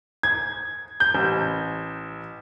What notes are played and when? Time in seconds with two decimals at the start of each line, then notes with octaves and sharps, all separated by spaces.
0.23 G#6
1.00 G6
1.15 A1